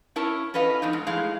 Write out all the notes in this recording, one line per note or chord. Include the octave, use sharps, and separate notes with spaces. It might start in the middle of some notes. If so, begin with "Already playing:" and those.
C#4 E4 A#4 C#5 A5
C#4 A4 B4 D#5 F5
F2 B2 D4 D#4
G#2
A2 F3 G#3 G#4 D#5 F5